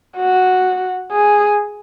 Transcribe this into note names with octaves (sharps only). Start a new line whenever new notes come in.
F#4
G#4